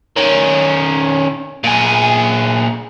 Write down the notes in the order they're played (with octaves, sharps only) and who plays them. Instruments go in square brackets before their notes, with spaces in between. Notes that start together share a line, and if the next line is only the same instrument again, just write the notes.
[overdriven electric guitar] D#3 C#4
A#2 G#4